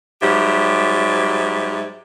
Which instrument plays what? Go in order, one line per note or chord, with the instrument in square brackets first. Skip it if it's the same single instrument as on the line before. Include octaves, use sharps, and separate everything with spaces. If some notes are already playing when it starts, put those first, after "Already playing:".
[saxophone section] G#2 F#3 G3 G4 E5